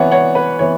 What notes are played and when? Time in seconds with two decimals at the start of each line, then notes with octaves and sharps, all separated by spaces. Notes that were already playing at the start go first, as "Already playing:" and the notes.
Already playing: E3 B3 C#5 F#5
0.12 C#5 F#5
0.35 B4
0.59 E3 B3 C#5